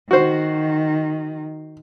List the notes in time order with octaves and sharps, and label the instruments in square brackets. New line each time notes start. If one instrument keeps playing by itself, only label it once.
[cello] D#3 [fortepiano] F#4 C5